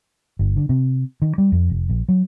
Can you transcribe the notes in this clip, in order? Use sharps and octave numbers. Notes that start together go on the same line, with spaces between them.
G1
D3
C3
D#3
G3
F2
F1
A#1
F#3